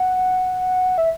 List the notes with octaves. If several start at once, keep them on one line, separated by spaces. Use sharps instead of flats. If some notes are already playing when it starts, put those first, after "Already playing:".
Already playing: F#5
E5